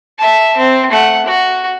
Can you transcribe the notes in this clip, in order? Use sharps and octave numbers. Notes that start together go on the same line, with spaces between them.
E5 A5
C4
A3 F#5
F#4